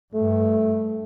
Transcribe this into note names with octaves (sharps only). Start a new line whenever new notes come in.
G2 A3